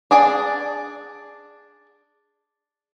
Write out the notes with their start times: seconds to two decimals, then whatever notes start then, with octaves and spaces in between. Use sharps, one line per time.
0.11 D4 G#4 D5